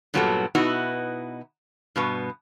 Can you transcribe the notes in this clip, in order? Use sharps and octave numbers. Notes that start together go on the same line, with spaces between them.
G2 A#2 F#3 B3 G4 A4
B2 B3 D#4 E4 F#4
G2 B2 B3